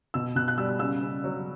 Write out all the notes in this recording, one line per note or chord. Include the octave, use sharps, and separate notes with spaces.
B2 E6
B2 F#6
F#6
G3 E6
C#3 E6
C#3
F#3